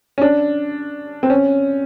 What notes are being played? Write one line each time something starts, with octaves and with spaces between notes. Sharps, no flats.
C#4
D4
C4
C#4